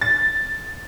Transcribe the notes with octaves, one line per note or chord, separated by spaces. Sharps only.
A6